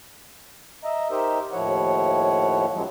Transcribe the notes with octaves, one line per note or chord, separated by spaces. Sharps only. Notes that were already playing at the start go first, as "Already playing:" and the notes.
D#5 E5 A#5
D#4 G4 A#4 C5 D#5 E5
D#2 A2 F3 E4 C#5 F#5
F#2 F3 F#3 G#3